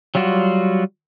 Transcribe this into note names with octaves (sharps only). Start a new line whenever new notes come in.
F#3 G3 F4 F#4